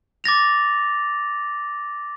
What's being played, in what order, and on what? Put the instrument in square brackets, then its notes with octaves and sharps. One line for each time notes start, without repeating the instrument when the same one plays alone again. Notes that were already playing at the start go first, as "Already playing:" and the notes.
[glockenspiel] D6 A6 A#6 F7